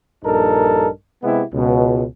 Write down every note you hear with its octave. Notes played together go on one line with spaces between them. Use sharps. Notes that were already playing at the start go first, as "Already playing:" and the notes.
A#1 G2 D#4 A4 A#4
C3 G#3 B3 E4 G4
C#2 B2